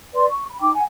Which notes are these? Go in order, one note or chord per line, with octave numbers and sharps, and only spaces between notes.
B4 D5 C6
C#6
B5
D#4 G5 D6
F#5 G#5